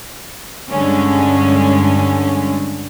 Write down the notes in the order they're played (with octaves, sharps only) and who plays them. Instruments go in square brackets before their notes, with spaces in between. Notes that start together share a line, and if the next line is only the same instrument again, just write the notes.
[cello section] G2 D3 G#3 C#4